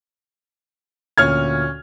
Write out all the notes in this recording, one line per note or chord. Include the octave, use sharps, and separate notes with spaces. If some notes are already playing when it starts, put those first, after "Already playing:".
D2 A#2 C#4 F6 G#6